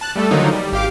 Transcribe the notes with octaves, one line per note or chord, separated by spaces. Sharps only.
A5 F#6
G3 A3 A4
D3 D#3 F3 F#3 A#3 D#4
G3
G#1 G4 F5 D6